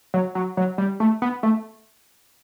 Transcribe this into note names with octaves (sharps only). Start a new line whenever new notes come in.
F#3
F#3
F#3
G3
A3
B3
A3